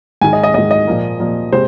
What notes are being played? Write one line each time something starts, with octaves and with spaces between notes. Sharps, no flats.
G#2 D#3 G#3 G#5
D#5
D#5
G#2 D#3 G#3 D#5
D#5
A#2 F3 A#3
A#2 F3 A#3
C3 G#3 C5